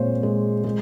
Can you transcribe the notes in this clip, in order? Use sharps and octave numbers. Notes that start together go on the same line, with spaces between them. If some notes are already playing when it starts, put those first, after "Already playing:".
Already playing: A#2 G#3 C4 C5 C#5
G#3
G#3